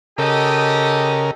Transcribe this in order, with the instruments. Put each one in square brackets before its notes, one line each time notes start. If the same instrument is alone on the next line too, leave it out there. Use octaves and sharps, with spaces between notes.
[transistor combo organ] C#3 A#4 [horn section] G4 A4 D#5